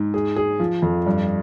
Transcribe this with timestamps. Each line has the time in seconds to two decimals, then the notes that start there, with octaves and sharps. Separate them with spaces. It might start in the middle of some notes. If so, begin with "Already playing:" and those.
Already playing: G#2
0.14 G#4
0.36 G#4
0.60 F3
0.82 F2
1.06 G2